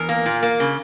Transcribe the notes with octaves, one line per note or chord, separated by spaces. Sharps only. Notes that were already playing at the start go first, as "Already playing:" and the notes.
Already playing: E2 A#4
A#3
A#2
A#3
C#3